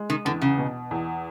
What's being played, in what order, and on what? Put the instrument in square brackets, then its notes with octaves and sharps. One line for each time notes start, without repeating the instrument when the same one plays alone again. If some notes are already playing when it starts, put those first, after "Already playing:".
Already playing: [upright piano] G#3
[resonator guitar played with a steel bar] D#3
[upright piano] E2 [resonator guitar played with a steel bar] D3
[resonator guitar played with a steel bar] C#3
[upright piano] B2
E2